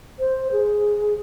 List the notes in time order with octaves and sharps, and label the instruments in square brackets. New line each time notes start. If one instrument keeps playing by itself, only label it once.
[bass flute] C5
G#4